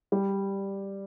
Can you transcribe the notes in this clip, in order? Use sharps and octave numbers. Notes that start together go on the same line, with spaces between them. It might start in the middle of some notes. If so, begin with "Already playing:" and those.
G3